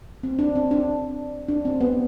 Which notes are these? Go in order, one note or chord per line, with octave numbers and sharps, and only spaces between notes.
C4
D4
C4
D4
D4
C4
B3